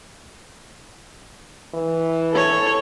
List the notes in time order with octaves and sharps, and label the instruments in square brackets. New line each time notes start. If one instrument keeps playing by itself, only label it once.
[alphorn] E3
[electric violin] A4 C#5